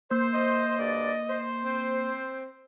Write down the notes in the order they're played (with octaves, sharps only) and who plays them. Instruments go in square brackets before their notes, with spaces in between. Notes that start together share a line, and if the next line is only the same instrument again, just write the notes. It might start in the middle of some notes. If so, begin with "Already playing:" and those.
[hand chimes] A#3 [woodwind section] C5
[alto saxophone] D#5
[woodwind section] D2 G2 D5
C5
[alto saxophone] C4